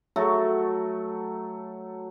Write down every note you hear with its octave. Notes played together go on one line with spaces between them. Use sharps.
F#3 A3 F#4